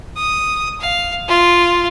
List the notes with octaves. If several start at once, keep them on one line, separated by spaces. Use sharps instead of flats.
D#6
F5
F4